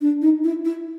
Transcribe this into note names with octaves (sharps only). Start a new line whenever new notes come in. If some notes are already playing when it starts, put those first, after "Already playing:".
D4
D#4
E4
E4